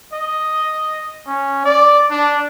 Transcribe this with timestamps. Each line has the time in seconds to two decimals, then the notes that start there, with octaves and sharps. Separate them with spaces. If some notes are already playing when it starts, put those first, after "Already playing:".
0.13 D#5
1.27 C#4
1.65 D5
2.10 D4